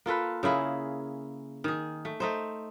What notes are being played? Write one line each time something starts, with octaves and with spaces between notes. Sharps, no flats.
A#3 F4 A4 B4
C#3 A#3 E4 G#4
D#3 G#4
A3
A3 D#4 C5